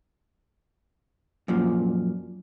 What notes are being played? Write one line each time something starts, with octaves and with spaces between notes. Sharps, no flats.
F#2 A#2 F3